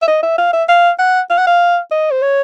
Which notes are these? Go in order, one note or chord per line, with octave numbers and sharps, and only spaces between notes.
E5
D#5
E5
F5
E5
F5
F#5
F5
F#5
F5
D#5
C5
C#5